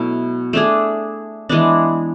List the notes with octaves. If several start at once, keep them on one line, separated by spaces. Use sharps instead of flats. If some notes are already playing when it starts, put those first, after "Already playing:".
Already playing: B2 F#3 A3 E4
A3 D4 G#4
E3 G#3 B3 D4